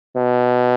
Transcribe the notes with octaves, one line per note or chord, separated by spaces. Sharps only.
B2